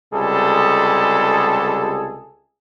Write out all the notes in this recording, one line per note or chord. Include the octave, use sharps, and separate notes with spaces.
C#2 C3 G3 G#4 A4